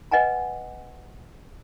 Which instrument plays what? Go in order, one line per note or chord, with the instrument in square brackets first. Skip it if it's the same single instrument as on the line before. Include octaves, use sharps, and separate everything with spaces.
[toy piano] B4 D#5 F#5 G#5 A#5